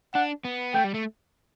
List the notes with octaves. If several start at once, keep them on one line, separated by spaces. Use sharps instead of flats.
D4 F#5
B3
A3 G5
G3
A3